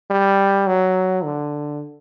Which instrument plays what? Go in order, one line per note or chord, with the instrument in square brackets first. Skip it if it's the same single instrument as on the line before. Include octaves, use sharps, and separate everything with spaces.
[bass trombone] G3
F#3
D3